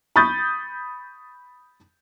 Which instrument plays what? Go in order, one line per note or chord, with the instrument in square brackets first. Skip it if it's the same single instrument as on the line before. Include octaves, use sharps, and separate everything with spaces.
[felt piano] B5 C#6 D#6 G6 A6